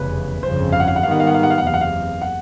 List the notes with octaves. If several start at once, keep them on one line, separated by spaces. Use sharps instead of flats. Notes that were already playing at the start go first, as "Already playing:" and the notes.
Already playing: F1 E2 C#3 B4
G1 F2 C#3 C5
F5
F#5
F5
F#5
G#2 D#3 G3 B3 F5
F#5
F5
F#5
F5
F#5
F5
F#5
F#1 E2 C3 F5
F#5
F5
F#5